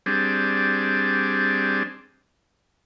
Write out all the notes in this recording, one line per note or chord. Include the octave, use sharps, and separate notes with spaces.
G3 C4 D4 G#4